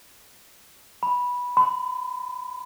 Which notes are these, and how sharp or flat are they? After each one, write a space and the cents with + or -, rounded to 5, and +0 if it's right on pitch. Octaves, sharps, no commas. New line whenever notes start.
B5 -10
B5 +45